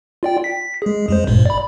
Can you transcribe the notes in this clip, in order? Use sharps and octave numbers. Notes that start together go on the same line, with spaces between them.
F4 D5 G5
B6
G#3 G#4
F2 G#3 C5
G#1 G2 A#2
D5 B5